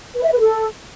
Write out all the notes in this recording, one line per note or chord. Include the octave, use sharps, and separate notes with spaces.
B4
E5
B4
A4